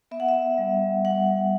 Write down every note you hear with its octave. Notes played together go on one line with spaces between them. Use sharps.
B3 E5
F#5
E5
G3
G3 F#5